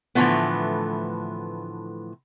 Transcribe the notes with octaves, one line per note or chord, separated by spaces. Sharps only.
A2 D3 E3 F3 A3 B3